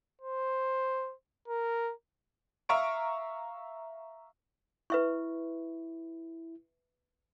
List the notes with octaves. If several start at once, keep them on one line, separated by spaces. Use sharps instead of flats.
C5
A#4
E5 F5 A#5 C#6 F6 D7
E4 B4 E5 C#6